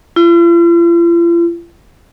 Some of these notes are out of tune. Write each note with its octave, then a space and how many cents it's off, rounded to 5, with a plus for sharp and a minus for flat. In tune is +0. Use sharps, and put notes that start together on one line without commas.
F4 -45